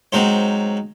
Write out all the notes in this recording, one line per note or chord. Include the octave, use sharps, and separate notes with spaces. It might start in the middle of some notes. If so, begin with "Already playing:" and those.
G#2 F#3 C4 C5